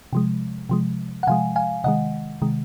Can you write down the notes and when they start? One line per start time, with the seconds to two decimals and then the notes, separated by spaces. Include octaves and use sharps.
0.13 C3 F3 G#3
0.69 C3 F3 G#3
1.23 F#5
1.27 C3 F3 G#3 F5 G#5
1.56 F5 G#5
1.84 C3 D#3 G#3 D#5 F#5
2.42 C3 D#3 G#3